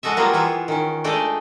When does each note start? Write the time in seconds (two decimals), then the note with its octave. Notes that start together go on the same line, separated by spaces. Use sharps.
0.03 G#3 F#4 A4 D#5 E5
0.17 F#3 G3 A#3 B3 F4 G#4
0.33 E3 F4 B4 C#5 E5
0.68 D#3 C#4
1.04 G#3 A3 D4 D5 D#5 G5